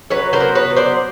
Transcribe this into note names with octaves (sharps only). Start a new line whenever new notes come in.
F#3 B4 C#5
A#4 C5
B3
B4 C#5
F#3
C5 D5